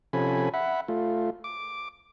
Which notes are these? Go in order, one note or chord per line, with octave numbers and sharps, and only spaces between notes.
C3 F3 C#4 A4 G#5 B5
E5 F#5 B5
A3 F4
D6